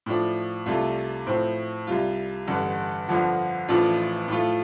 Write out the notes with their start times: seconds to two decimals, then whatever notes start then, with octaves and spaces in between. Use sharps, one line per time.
0.06 A2 F3 D4
0.66 C2 C3 A3 D4 F4
1.27 A2 F3 C4
1.87 C2 C3 G3 F4
2.48 A1 G2 D3
3.08 G1 F2 D3 F3
3.68 A1 A2 F3 D4 F4
4.28 A2 F3 A3 F4